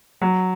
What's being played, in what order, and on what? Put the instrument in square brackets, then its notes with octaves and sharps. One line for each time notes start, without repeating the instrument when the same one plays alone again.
[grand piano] F#3